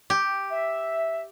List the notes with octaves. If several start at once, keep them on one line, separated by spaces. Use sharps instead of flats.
G4
E5